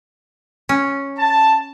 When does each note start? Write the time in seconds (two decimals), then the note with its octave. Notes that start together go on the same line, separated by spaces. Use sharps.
0.69 C#4
1.18 A5